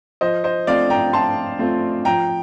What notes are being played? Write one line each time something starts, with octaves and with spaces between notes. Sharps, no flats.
F3 C5 D#5
C5 D#5
A3 C4 F4 D5 F5
G5 A#5
F3 A5 C6
A3 C4 F4
F3 G5 A#5